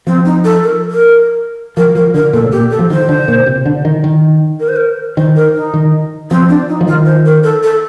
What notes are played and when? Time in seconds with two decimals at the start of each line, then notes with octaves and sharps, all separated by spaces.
0.07 F3 C4
0.25 D#4
0.44 A4
0.63 A#4
0.91 A#4
1.77 F3 A#4
1.95 F3 A#4
2.14 D3 A#4
2.33 A#2 A4
2.42 A2
2.52 A#2 G4
2.71 A4
2.79 F3
2.90 D#3 C5
3.09 D3
3.28 A#2
3.46 C3
3.65 D3
3.85 D#3
4.04 D#3
4.60 A#4
4.68 C5
4.76 A#4
5.17 D#3 C5
5.36 A#4
5.54 D#4
5.74 D#3
6.30 F3 C4
6.49 D4
6.69 D#4
6.81 F3
6.87 D#3 F4
7.05 C5
7.25 A#4
7.43 A4
7.63 A4